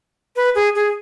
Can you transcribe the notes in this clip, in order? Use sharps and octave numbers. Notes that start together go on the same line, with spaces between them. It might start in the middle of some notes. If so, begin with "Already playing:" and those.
B4
G#4
G#4